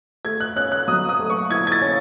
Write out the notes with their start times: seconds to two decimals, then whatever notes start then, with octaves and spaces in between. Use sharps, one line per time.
0.25 A3 G#6
0.40 F#6
0.56 C#4 F#6
0.72 F#6
0.88 F#3 D#6
1.09 D#6
1.20 A3
1.30 C#6
1.51 E4 G#6
1.67 G#6
1.72 A6
1.82 C#4